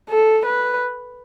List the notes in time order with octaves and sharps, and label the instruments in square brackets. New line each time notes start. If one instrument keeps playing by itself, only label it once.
[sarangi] A4
B4